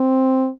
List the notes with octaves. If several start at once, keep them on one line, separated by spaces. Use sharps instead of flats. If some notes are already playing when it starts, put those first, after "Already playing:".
Already playing: C4